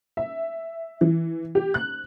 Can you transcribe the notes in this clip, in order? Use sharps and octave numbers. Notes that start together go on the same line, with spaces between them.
E5
E3
G4
F#6